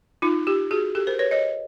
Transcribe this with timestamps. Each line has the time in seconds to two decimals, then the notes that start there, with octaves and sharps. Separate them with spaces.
0.22 D#4 F4
0.47 F4 G4
0.71 F#4 G#4
0.95 G4 A4
1.07 A#4 C5
1.19 B4 C#5
1.31 C#5 D#5